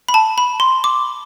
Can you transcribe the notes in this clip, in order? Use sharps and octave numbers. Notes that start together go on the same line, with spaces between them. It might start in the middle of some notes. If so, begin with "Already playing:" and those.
B5
A5
B5
C6
D6